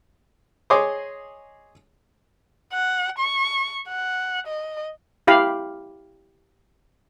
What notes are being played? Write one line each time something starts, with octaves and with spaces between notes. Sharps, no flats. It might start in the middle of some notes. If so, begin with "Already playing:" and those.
G#4 C#5 D#5 C6 D6 D#6
F#5
C#6
F#5
D#5
E4 G4 F5 B5